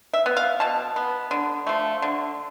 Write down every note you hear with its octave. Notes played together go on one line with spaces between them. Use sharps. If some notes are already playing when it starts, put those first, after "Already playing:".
E5
B3
F5
B2 A5
B3
D3
F3 A3
D3